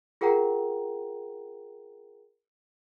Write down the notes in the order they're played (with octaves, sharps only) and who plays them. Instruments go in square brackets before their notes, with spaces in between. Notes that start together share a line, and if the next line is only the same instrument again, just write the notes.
[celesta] F4 G#4 A#4 F#5 G5 A#5